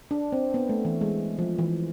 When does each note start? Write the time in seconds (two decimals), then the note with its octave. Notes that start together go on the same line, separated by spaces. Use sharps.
0.11 D4
0.32 C4
0.54 B3
0.69 A3
0.85 E3
1.01 G#3
1.39 F3
1.59 E3